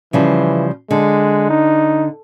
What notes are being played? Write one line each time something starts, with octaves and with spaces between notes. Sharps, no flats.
C#3 E3 F3 G3
D3 G#3
D#4